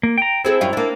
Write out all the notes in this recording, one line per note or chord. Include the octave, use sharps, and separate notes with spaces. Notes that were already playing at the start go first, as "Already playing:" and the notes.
A#3
G5 A#5
C4 E4 G#4 A4
F#2 G3 F4
A#3 D4